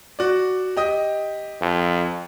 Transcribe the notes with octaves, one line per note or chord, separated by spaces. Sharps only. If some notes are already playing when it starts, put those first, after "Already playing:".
F#4 D5
G4 D#5 D#6
F2